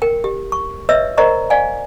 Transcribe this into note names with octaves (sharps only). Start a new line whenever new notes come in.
A#4 G5
G4
C#6
B4 C#5 D#5 E5 E6
A#4 C5 D5 D#5 A#5 C#6
D5 F5 G#5